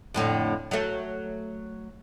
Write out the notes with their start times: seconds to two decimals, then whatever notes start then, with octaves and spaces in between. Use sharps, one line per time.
0.14 F2 A2 D3
0.71 F#3 A3